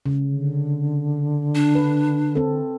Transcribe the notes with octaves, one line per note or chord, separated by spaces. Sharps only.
C#3
D3
D4
B4
C4 A4